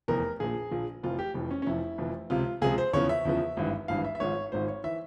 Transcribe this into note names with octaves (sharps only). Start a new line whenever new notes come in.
F1 E2 E3 A#4
A#1 A#2 F3 G#4
A#1 A#2 F3
F1 F2 E3 F4
G4
F1 F2 E3
C#4
C#4
F1 F2 E3 E4
F1 F2 E3
C#2 C3 F3 F4
C#2 C3 F3 G#4
C5
E2 C#3 F3 C#5
E5
E2 C#3 F3
G#1 G2 E3
G#1 G2 E3 F5
E5
E5
G#1 G#2 F3 C#5
G#1 G#2 F3 C5
C#5
E3 E5